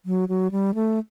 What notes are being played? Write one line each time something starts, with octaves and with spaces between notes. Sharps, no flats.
F#3
F#3
G3
A3